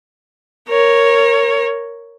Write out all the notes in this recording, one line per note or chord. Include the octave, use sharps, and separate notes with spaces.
A#4 C#5